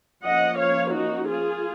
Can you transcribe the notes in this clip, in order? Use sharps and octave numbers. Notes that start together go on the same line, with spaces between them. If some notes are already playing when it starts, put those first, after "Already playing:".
F3 A#3 C#4 D#5 F#5
C#5 F5
D#4 F#4
F4 G#4